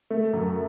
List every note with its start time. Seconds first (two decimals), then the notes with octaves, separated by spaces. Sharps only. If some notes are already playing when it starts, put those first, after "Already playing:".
0.10 A3
0.33 F#2